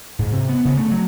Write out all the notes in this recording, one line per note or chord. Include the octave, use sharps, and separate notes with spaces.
G#2
C3
B3
C#3
A3
F#3